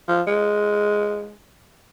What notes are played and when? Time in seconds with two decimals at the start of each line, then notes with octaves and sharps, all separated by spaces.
0.09 F3
0.27 G#3